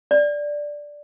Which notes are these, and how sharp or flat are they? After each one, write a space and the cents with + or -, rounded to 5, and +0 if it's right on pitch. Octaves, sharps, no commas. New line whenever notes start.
D5 +0